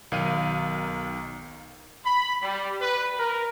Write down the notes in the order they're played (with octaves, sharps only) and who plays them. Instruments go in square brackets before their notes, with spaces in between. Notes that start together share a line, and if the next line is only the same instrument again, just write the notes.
[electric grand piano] B1 D#3 F5 D#7
[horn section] B5
G3
B4
A#4